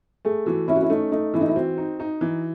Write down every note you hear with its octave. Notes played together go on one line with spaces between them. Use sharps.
A3 G#4
E3 F#4
C#4 E4
F#4
E4
A3 D#4
A3 D#4
E3 E4
D#4
E4
C4 F#4
D#4
D#4
E3